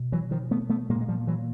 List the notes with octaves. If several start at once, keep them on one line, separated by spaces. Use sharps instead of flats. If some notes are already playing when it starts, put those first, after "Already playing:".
Already playing: B2
E3 F#3
D#3 F3
A3 B3
A3 B3
A#2 G#3 A#3
G#3
F3 G3
E3 F#3